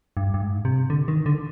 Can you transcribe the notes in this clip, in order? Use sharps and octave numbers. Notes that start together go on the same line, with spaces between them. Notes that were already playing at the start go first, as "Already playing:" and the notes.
G2
G2
G#2
C3
D3
D#3
D3